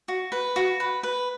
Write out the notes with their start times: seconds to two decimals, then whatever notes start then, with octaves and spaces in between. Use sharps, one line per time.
0.08 F#4
0.32 B4
0.56 F#4
0.80 B4
1.03 B4